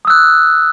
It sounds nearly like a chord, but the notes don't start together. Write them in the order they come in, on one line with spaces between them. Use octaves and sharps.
D#6 E6 F#6